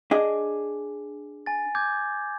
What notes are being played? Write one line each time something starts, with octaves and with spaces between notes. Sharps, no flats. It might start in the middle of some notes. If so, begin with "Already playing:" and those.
D4 G#4 D#5
G#5 A6
D6 G6 G#6